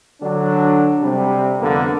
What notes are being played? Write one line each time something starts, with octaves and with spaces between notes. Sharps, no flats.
D3 F#3 D4
C3 G3
F2 D3 A#3 B3